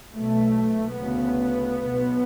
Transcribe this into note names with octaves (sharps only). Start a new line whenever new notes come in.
B1 B2 A3
D2 C#3 B3
B1 B2